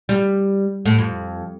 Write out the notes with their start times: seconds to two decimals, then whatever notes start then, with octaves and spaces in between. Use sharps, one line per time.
0.09 G3
0.86 A2
0.98 F2